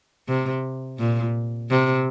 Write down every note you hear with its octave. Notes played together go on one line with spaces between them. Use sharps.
C3
A#2
C3